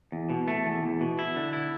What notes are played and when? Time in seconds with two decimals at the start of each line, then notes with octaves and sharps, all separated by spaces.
0.12 E2
0.30 B2
0.48 A3
0.66 E2
0.83 E2
1.01 B2
1.19 E4
1.36 D3
1.53 E4